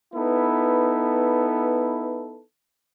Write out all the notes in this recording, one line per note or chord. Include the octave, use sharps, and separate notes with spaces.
B3 D#4 E4 A4 B4